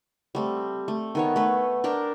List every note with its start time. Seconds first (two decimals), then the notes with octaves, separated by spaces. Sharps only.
0.35 G3 A3 C4
0.88 A3
1.15 D#3 B3 C#5
1.36 A3 B4
1.84 D4 A#4 G5 A5